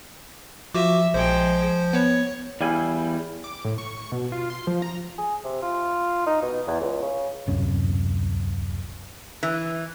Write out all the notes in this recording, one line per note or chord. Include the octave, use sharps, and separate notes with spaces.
F3 F#4 E5 D6
A#1 F3 G#3 C5 G5
B3 C#5
E2 G3 E4 F5 G#5
D6
A2
C#6
B2
F4
C6
F3
A#5
G#4
C3
F4
D#4
B2
E2
C#2
C#3
D1 C2 F#2 C#4
E3